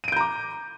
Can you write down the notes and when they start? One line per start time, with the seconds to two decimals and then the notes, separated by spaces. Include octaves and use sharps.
0.04 D#7
0.08 D7
0.12 G6
0.16 A#5
0.21 D6